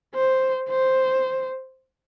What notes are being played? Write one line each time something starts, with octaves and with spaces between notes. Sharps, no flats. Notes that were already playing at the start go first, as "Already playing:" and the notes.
C5
C5